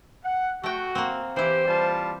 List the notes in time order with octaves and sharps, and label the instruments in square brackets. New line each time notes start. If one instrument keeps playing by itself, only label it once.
[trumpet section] F#5
[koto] A3 G5 [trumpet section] F#4
[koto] A#3 C4
[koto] E3 E4 [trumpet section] G4 [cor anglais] C5
[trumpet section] G3 F4 A5